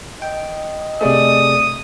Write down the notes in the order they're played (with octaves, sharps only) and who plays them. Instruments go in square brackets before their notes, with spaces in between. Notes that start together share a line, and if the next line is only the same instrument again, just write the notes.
[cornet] D#5 [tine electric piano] G5
[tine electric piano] C3 G#4 [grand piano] A3 D5 [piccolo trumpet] D#6